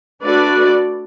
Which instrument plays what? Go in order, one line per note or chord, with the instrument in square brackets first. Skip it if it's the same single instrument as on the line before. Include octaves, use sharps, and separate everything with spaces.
[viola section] A3 D4 F#4 B4 D5